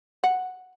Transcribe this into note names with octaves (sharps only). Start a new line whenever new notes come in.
F#5